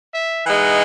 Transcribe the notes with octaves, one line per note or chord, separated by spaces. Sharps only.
E5
E3 G#3 D#4 F#5